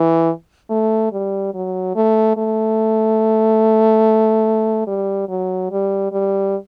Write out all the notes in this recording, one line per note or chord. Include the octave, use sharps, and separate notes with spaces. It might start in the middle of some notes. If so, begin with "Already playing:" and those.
Already playing: E3
A3
G3
F#3
A3
A3
G3
F#3
G3
G3